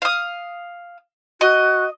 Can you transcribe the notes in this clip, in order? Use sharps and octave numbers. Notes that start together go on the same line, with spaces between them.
F5 D#6
F#4 D#5